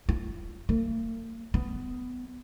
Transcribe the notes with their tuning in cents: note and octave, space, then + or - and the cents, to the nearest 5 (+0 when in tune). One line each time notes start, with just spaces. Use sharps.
F4 -45
A#3 -45
B3 +15